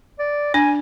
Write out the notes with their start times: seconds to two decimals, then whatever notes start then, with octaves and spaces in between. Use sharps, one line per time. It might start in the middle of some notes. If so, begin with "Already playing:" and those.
0.19 D5
0.54 D4 G#5